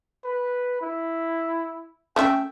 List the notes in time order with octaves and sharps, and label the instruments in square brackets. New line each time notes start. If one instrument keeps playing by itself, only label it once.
[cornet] B4
E4
[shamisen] A3 C#4 E5 [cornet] G5